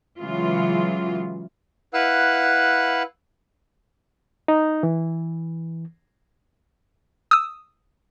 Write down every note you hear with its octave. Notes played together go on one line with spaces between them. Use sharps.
C#3 E3 F#3 G#3 F4
E4 B4 F5 F#5 E6 F#6
D#4
E3
D#6 E6